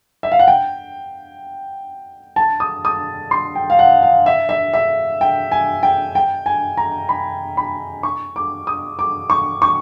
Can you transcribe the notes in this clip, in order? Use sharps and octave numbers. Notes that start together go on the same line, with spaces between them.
E5
F5
F#5
G5
A5
D#6
D#6
C6
G5
F5
F#5
F5
E5
E5
E5
G5
G#5
G5
G5
G#5
A#5
B5
B5
C#6
D6
D#6
D6
C#6
C#6